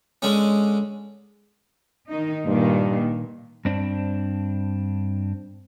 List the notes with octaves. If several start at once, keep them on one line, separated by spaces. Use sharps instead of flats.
D3 G#3 C#4
D#3 D#4
G2 A#2 D#3
G2 C4 D4